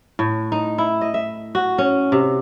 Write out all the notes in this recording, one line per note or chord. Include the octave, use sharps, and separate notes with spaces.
A2
D#4
E4
D#5
E5
F#4
C#4
C3